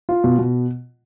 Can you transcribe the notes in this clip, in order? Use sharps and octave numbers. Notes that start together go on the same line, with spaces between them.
F4
B2
B2